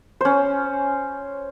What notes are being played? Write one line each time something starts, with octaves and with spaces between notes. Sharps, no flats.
C#4 C5